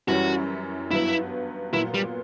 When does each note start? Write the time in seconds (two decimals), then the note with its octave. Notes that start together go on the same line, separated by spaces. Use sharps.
0.08 F#2 E3 G3 C#4 F#4
0.91 G2 F#3 B3 E4
1.73 A#2 F#3 B3 E4
1.94 G3